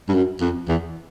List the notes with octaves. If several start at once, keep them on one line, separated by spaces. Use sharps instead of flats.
G2
F#2
F2
E2